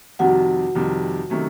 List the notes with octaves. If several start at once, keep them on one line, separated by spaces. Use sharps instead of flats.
F2 C3 D#3 G3 F#4 F#5
F2 C3 D#3 G3
C3 D#3 F#3 A3 C#4